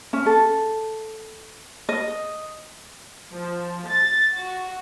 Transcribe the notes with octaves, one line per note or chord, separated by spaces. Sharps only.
C#4
A4
D#5
F3
A6
F#4